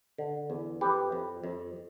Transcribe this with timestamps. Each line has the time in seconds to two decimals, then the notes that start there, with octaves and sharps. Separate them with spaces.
0.18 D3
0.50 E2
0.81 F2 G4 B4
1.12 F2
1.44 F2